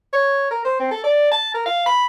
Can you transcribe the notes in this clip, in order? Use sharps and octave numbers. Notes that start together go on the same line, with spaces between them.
C#5
A#4
C5
C4
A4
D5
A5
A#4
F5
B5